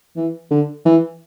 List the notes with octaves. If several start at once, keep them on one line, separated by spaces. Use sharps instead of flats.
E3
D3
E3